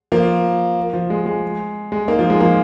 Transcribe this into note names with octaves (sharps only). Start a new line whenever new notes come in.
F3 A#3
F3
G#3
G#3
G#3
A#3 D#4
F3
G#3
F3 A#3